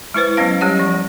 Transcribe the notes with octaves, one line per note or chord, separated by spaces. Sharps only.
G#3 E4 B4 C5
F#3 B3 C#4 F5
F#3 G3 C#4 G4 C#5 F#5
F3